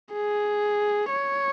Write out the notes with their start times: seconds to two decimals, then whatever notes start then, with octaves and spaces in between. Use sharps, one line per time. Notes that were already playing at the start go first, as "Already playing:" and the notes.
0.13 G#4
1.10 C#5